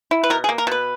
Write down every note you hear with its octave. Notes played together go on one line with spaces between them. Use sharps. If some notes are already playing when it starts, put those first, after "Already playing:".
E4
B4
B2 A#4
G#4
A#3
A#4
B2 B4